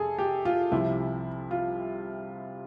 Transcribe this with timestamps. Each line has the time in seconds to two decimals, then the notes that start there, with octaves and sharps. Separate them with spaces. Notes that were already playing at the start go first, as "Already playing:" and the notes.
Already playing: F2 C3 G#4 A4
0.19 G4
0.45 F4
0.71 C2 C3 F3 E4
1.51 F4